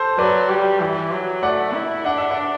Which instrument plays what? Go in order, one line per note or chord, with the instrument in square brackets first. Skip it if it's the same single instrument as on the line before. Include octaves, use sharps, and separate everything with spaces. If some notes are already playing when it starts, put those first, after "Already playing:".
Already playing: [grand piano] A4 C5
[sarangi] F#3 [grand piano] B4 D5
[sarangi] G3
E3
F#3
[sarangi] A3 [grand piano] D5 F#5
[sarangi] E4
[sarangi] D4 [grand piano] F#5
[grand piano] E5
D5 F#5